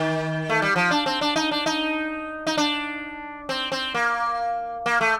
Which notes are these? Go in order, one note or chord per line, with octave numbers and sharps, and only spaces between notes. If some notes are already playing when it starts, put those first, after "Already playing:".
Already playing: D#3
A3
G3
F3
D4
C4
D4
D#4
D4
D#4
D#4
D4
C4
C4
A#3
A#3
A3